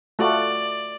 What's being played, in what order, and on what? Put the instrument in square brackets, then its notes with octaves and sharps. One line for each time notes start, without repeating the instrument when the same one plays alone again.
[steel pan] A3 F4 F#4 [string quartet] D5